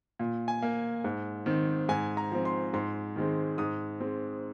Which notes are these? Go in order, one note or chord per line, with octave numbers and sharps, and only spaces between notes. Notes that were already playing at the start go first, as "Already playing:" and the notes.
A#2
G#5
A#3
G#2
D#3 C4
G#2 G#5
A#5
F3 C4
C6
G#2 C6
D#3 G#3 C4
G#2 D#6
G#3 C4